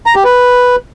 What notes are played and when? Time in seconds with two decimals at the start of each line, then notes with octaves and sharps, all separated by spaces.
0.06 A#5
0.15 G4
0.24 B4